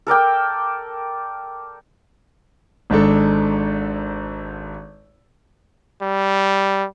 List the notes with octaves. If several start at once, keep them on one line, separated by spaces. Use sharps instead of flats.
A4 A#4 D5 G5
G#1 G#2 D4 A4
G3